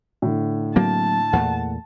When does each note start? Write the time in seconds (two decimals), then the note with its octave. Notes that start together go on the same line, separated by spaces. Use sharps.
0.22 A2 D3
0.76 F#3 A#3 C4 A5
1.33 E2 A#2 A3 F#5